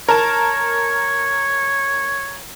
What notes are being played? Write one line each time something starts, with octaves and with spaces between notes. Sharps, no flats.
A#4 C#5 A5